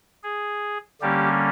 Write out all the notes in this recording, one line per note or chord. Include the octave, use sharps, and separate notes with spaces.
G#4
D3 G3 A#3 C#4 G4